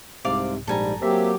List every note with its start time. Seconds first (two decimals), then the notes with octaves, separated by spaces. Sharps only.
0.25 C2 G#2 C3 D5 F5 D6
0.67 A#1 G#2 G3 A4 G#5 A#5
1.02 F#3 A#3 C4 G4 E5